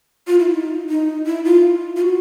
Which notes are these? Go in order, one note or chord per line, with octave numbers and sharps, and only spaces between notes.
F4
E4
D#4
D#4
E4
F4
F4
F#4